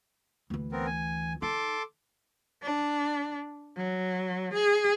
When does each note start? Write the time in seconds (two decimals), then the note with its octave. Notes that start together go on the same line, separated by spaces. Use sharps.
0.50 D2 E3
0.72 B3 C4 A#4
0.86 G#5
1.42 D#4 A4 C6 D6
2.62 D4
3.77 F#3
4.53 G#4